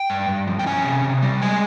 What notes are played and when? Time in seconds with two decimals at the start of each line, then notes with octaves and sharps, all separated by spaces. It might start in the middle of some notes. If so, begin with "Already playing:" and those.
Already playing: G5
0.10 G2
0.29 G2
0.47 F3
0.59 G5
0.66 C#4 G#5
0.84 C3
1.04 C3
1.22 G3
1.42 G#3 G#5